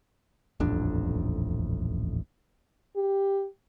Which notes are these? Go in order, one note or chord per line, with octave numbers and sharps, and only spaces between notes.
D#1 A1 F2 D4
G4